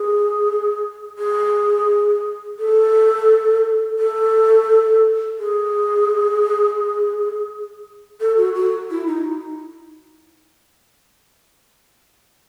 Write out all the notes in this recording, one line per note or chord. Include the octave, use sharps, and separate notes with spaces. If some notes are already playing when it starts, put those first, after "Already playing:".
Already playing: G#4
G#4
A4
A4
G#4
A4
F#4
F#4
E4
D#4